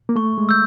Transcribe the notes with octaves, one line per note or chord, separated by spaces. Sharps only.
A#3
A3 C#6
G#3
E6 G6